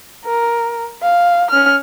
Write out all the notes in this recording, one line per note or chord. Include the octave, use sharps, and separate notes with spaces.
A#4
F5
C#4 F6